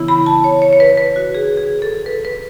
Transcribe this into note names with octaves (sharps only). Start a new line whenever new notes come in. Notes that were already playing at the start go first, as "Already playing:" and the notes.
Already playing: C#3 E3 B3 E4
B5
A5
C#5
C#5
C#5
B4
B4
F#4
G#4
G#4
A4
B4
B4